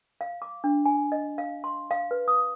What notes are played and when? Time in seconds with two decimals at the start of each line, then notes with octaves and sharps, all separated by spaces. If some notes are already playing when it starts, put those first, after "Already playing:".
0.21 F5
0.42 D6
0.64 D4
0.86 G#5
1.12 D#5
1.38 F5
1.64 C6
1.91 F5
2.11 B4
2.28 D#6